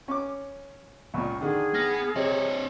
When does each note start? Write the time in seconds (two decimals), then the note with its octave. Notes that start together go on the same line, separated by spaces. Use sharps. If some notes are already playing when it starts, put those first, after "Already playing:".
0.08 C#4 D6
1.14 C#2 A#2 C#6
1.41 D3 D#3 G#4
1.74 B3 F6 A#6
2.16 C3 C4 C#5 D#5